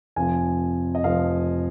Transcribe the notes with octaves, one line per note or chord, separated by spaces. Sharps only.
F1 F2 F3 G#5
D#5
F1 F2 F3 F5